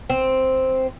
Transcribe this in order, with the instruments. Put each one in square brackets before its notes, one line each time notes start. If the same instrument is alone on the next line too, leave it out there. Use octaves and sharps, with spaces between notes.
[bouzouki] C4